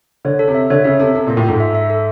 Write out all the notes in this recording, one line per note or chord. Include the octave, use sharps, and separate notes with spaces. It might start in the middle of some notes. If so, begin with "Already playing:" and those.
D3 C#5
A4
C3
E5
D3 C#5
C#3 E5
C3 A4
C3 A4
A#2
F4
A2
G#2 A4
E5
E5
A4